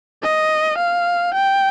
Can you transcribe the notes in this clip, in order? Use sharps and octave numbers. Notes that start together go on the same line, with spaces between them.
D#5
F5
G5